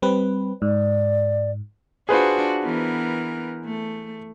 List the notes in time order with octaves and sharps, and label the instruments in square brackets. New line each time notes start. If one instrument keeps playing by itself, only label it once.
[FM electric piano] G3 C4 B4
[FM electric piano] G#2 [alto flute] D5
[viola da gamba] D4 F4 F#4 [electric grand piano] G#4 B4 C5
[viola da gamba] E3 B3 A#4
A3